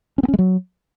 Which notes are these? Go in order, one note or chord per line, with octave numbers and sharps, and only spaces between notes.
C#4
B3
C#4
G#3
F#3